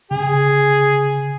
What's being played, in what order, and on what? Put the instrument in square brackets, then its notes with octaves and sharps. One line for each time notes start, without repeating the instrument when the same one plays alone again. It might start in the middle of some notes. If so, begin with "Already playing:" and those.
[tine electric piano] C#3 [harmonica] G#4